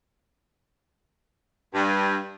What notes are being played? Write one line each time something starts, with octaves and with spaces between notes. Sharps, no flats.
G2